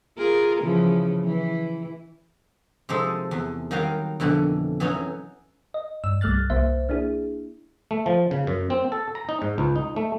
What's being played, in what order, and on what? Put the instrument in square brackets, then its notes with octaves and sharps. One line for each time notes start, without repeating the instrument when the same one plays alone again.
[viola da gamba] F4 G#4 A#4
C#3 E3 F3
E3
[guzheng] C3 F3 G#3 D#4 A4
E2
D#3 F#3 G3 F#4 F5
F2 B2 D3 E3
E3 F#3 C#4 D#4
[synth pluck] D#5
G2 E6
C2 G3 A3 F6 F#6 A6
C2 A#3 C5 E5
A#3 D4 E4 G#4
[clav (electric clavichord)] A3
F3
C#3
F#2
C4
A4
A#5
D#4
G#2
C#2
D#4
A3